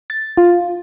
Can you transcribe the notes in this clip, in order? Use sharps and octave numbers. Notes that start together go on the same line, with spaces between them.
A6
F4